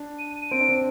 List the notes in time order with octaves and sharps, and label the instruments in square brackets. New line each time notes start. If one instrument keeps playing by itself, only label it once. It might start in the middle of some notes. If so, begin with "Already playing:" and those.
Already playing: [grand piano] D4
[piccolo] D#7
[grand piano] C4 [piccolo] D7
[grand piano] D4
C4